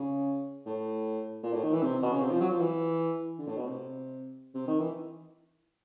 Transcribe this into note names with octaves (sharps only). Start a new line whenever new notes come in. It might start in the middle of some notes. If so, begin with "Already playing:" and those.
Already playing: C#3
A2
A#2
A2
D#3
E3
C3
B2
C#3
C3
F3
F#3
F3
E3
D3
A2
B2
C3
C3
D#3
E3